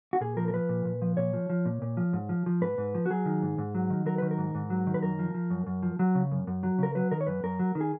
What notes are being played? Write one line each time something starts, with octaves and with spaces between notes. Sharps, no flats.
F#4
A#2 G#4
F3 A#4
A#4
F3 B4
A#2
A#2
F3
A#2 C#5
F3
F3
A#2
A#2
F3
G#2
F3
F3
G#2 B4
G#2
F3
F#4
F#3 G#4
D#3
G#2
G#2
F#3
D#3
F#3 A#4
D#3 B4
A#4
G#2
G#2
F#3
D#3
B4
F#2 A#4
F3
F3
F#2
F#2
F3
F#3
C#3
F#2
F#2
F#3
C#3 A#4
F#3 B4
D#3 A#4
C#5
F#2 B4
F#2 A#4
F#3
D#3
G#4